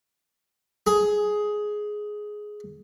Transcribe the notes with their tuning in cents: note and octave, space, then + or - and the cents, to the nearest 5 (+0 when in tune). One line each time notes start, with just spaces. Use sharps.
G#4 +10